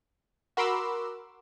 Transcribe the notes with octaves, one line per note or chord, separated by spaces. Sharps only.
F#4 A#4 B5 C6 D6 E6